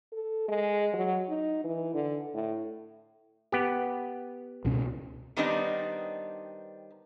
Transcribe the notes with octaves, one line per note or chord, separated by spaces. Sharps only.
A4
G#3
F#3
D#4
E3
D3
A2
B3 G4
C#2 B2 C#4
D#3 G3 B3 C4 D4 D#4